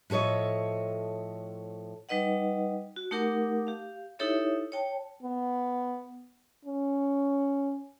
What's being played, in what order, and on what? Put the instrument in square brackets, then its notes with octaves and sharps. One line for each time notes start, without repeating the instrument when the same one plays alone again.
[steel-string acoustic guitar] A2 F3 A4 C#5 D#5
[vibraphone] G3 D#4 B4 D#5 F#5
F#4
A3 D#4 G4 A#4 F#5 D6
G4 F5
D#4 E4 G4 A4 C#5 E5
C#5 G5 A5
[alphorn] B3
C#4